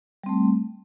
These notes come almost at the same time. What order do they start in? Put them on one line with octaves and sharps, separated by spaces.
G3 C4 A3